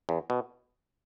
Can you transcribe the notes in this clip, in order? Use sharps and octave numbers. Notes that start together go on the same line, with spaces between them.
E2
B2